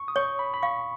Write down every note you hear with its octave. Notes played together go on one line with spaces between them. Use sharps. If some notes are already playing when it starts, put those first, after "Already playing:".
Already playing: C#6
D#6
C#5 C#6
B5
B5
F5 C#6